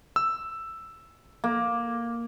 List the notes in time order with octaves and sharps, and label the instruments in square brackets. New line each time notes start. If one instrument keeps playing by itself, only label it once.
[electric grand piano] E6
[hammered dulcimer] A#3